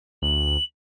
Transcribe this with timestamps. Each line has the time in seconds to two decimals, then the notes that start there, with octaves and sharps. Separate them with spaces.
0.22 D2 F#7